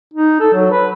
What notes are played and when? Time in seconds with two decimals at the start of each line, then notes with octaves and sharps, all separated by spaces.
0.14 D#4
0.41 A4
0.54 F#3
0.72 B4